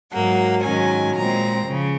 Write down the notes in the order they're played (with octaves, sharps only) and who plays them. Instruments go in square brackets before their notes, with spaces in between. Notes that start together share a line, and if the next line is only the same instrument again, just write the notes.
[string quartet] G#2 F#3 A#3 F#5
G#2 D#3 F#3 C#4 G#5
A#2 G#3 C4 A#5
C#3 F3